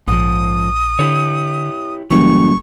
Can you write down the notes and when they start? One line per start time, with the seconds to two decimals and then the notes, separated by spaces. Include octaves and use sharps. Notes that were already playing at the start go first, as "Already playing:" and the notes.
0.08 A#1 G#2 F3 D#6
0.99 D3 E4 G4 C#5
2.11 F#1 A2 E3 G3 A4 C#6